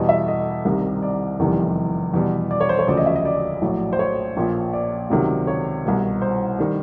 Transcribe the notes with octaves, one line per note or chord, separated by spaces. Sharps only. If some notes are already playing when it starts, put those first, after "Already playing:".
Already playing: E2 B2 G3 D#5
E5
D#5
C2 C3 D#3 G3
D5
F1 E2 C3 D#3 G3
E2 B2 G3
D5
C#5
C5
C#5
E1 D2 C#3 F3 D5
D#5
E5
D#5
D5
A#1 A2 F#3
C5
C#5
A#1 A#2 F3
D5
C#2 C3 D#3 F#3
C#5
C2 B2 G3
C5
D#3 G3